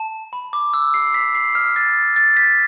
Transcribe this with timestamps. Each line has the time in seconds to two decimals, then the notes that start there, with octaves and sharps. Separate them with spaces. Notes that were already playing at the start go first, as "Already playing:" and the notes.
Already playing: A5
0.33 B5
0.53 D6
0.74 E6
0.94 C7
1.14 B6
1.35 C7
1.55 F6
1.76 A6
2.16 A6
2.37 B6